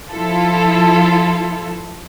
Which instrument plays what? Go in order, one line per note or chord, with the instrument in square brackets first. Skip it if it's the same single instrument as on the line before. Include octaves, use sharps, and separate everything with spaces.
[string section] F3 E4 F4 A4